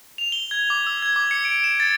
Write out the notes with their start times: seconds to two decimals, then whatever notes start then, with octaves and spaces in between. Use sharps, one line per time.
0.18 F7
0.32 G7
0.51 G#6
0.70 D6
0.87 E6
1.02 G#6
1.16 D6
1.31 C#7
1.45 D7
1.64 E7
1.80 A6